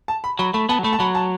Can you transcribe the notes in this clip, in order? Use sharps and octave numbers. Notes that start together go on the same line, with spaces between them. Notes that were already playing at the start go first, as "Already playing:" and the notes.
A5
B5
F#3 B5
A3 B5
B3 A5
F#3
A3 B5
A5
F#3 B5
A5